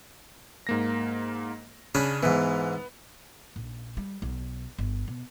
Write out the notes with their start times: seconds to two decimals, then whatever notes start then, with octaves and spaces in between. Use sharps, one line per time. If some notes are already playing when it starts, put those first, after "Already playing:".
0.67 G#2 A#3 A#6
1.95 C#3 C#4 D4 B5
2.23 G#2 E3 B3
3.56 A#1
3.97 G3
4.22 B1
4.78 G1
5.08 B2